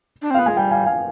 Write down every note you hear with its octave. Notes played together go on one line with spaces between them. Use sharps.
D4
C4
B3 F5
G#3 G#5
G3 G5
F5 G#5
F5 G#5